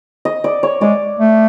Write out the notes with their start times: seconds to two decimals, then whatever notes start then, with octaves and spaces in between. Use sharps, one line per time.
0.25 D#5
0.44 D5
0.63 C#5
0.81 G#3 D5
1.19 A3